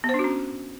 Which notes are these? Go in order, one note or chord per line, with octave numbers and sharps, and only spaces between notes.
B3
C5
D4
F#4
C#4